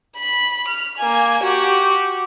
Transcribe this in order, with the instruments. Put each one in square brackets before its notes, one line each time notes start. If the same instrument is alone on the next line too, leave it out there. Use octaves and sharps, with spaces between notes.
[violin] B5
F6
A#3 G#5
F#4 G4